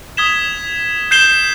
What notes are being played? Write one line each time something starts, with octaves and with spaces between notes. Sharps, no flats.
D#6 G#6 B6 E7 G7
G6 C7 E7 G7